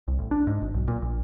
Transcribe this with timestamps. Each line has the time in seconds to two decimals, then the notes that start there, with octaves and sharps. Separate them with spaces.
0.08 C2
0.19 A1
0.31 D4
0.47 G#2
0.61 G#1
0.74 B1
0.88 A#2
1.02 A#1